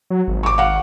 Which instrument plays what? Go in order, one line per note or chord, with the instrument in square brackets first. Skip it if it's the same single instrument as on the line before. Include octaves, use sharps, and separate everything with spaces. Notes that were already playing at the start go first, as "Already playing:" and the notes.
[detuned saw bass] F#3
G#1
[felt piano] C#6 D6
F5 F#5